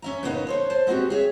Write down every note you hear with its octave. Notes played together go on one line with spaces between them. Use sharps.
C#4 E5 A#5
A2 C#3 A#3 B3 D#4
A4 C5 C#5
C5 A5
G#3 B3 C4 D4 F#4 G4
G#4 C#5 E5